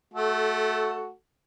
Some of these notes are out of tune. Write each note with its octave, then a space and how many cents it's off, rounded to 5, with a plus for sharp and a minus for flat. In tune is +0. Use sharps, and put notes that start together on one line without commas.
A3 -20 F#4 +0 A4 +0